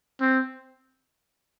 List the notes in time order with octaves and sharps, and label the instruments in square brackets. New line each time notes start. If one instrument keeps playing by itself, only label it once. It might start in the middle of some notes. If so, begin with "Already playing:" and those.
[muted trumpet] C4